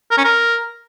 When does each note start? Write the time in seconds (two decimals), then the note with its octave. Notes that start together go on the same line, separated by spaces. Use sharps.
0.11 A#4
0.18 C#4
0.24 A#4